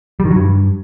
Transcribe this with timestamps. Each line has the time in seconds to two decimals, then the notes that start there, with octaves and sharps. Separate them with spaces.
0.20 G3
0.25 D#3
0.31 F#3
0.36 G2